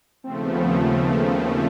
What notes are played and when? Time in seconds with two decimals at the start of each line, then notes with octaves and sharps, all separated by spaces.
0.23 D#2 C#3 F3 A3 C4
0.46 B3
0.67 B3
0.89 B3
1.12 A#3